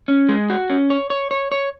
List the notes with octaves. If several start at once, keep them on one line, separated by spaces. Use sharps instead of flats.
C#4
G#3
F#4
C#4
C#5
C#5
C#5
C#5